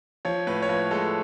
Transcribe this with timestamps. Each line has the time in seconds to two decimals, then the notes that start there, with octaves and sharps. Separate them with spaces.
0.25 F3 C#5
0.47 A2 B4
0.62 C#5
0.69 F3 B4
0.91 G#3 A4